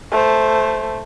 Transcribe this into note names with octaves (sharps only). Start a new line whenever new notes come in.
A3 C5